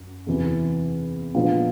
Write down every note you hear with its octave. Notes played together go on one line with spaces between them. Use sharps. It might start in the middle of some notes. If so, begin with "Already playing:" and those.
Already playing: F#2
E2 C3 E3
A#2 F3 G#3 B3 D4